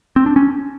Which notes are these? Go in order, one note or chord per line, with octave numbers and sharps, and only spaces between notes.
C4
D4
C#4